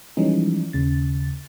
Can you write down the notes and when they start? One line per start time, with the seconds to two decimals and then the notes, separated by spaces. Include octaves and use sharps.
0.17 E3 F3 G3 G#3 C#4 D#4
0.73 D#2 C#3 A6